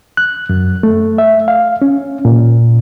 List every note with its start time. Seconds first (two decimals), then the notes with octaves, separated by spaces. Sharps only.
0.17 F#6
0.49 F#2
0.83 A3
1.18 E5
1.48 F5
1.82 C#4
2.25 A#2